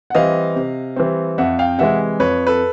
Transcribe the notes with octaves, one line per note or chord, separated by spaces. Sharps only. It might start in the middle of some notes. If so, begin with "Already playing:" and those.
F#5
E3 G3 C4 D#5 F5
C3
E3 G3 C4
F2 E5 F#5
F5 G5
C3 E3 G#3 E5 F#5
F2 B4 C#5
A4 B4